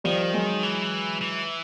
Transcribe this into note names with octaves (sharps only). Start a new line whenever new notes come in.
D#3 F3 G3
F#3 G#3
E3
E3